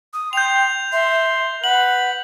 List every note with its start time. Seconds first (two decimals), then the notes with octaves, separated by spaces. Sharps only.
0.13 D#6
0.33 G5 C6 G6 F7
0.92 E5 C6
1.64 B4 F#5 F#7